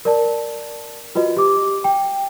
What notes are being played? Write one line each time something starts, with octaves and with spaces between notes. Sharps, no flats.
A#4 D5 A5
F4 F#4 B4 D#5
G4 D6
G5